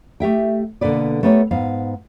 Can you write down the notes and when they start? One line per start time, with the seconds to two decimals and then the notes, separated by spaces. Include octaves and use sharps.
0.20 A3 G4 E5 G5
0.81 B2 D3 A#3 A4 B4 D5
1.23 A3 B3 G4 A#4 C#5
1.51 G#2 B3 F5